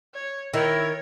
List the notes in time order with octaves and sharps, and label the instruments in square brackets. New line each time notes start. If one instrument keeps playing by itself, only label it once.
[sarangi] C#5
[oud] D#3 [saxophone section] E4 [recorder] A#4 [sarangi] C#5